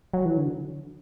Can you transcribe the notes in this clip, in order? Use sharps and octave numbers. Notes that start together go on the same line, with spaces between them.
F#3
E3
D3